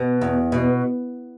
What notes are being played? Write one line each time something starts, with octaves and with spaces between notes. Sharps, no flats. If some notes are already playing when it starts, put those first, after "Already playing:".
Already playing: B2
E2
B2